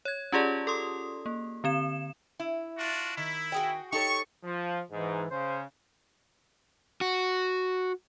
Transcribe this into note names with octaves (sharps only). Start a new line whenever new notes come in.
C#5 G#6
C#4 F4 G4 G#4 D5 A5
A4 C6 D#6
A#3
D3 C4 E7
E4
D4 F4 F#4
D#3 E4
F#4 G#4 G5
D#4 G4 A4 C#5 C#6
F3
G#2 E3
C#3 C5
F#4